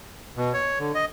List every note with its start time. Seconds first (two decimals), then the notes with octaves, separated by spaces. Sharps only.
0.37 B2
0.54 C#5
0.79 D3
0.95 D#5